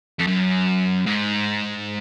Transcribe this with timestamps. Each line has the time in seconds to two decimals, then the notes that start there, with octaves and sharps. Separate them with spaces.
0.19 F2
0.27 F#2
1.06 G#2